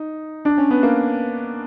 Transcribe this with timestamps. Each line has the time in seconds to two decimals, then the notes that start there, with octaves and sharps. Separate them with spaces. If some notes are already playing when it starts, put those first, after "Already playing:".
Already playing: D#4
0.45 D4
0.58 C#4
0.71 B3
0.83 A#3